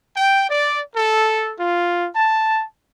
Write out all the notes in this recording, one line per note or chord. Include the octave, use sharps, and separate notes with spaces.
G5
D5
A4
F4
A5